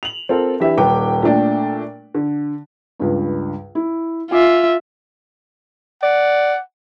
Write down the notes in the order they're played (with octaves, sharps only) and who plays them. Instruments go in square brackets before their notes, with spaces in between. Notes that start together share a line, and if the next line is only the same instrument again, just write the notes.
[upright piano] F7 F#7
C4 F4 A4 A#4
E3 D4 G4 E5
D#1 B4 G5 D6
A#2 A3 D4 G5
D3
[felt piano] C#2 G2
E4
[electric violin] F4 E5 [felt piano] G#5 D6
[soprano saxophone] D5 [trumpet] F#5